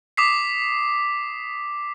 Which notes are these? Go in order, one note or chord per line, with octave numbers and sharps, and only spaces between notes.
D6 D#6 B6 C7